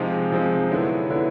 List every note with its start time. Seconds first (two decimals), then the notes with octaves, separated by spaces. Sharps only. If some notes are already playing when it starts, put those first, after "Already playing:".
Already playing: C3 F3 G#3 C4 D#4
0.32 C3 F3 G#3 C4 D#4
0.71 D3 F#3 B3 E4
1.10 D3 F#3 B3 E4